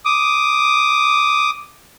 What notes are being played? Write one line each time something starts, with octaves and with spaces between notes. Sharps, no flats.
D6 D#6